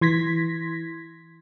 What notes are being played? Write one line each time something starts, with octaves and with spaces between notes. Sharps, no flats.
E3 C6 G#6 A#6 B6